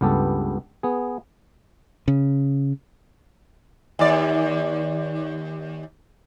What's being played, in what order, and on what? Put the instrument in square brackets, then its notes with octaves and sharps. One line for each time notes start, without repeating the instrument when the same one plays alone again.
[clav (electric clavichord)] C#2 G2 B3 G4 A4
B3 G#4
[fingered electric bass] C#3
[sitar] D#2 D5